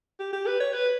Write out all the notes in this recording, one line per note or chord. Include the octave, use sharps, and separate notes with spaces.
G4
G4
B4
C#5
B4